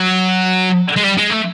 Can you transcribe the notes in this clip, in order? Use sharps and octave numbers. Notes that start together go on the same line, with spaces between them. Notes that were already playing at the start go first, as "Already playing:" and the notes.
Already playing: F#3
G#3
G3
G#3
A3